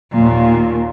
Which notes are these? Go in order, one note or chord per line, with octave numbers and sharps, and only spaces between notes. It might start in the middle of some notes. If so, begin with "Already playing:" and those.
D#2 A#2